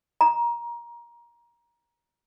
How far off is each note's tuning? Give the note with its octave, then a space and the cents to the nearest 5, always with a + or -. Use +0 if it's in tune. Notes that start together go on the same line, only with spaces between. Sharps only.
A#5 +20